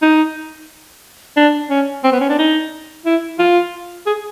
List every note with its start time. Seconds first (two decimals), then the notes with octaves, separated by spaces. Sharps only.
0.02 D#4
1.37 D4
1.70 C#4
2.04 C4
2.12 B3
2.20 C#4
2.29 D4
2.38 D#4
3.05 E4
3.39 F4
4.06 G#4